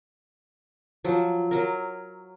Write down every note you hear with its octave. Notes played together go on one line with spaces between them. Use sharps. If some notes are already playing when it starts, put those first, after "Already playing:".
F3 F#3
F#3 A#4